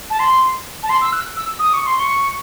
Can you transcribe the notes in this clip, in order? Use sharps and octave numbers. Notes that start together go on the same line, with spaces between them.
A5
C6
A5
C6
E6
F#6
E6
D#6
C#6
C6
C#6